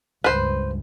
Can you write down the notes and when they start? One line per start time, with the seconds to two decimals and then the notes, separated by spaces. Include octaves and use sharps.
0.24 C#2 G2 B4 C5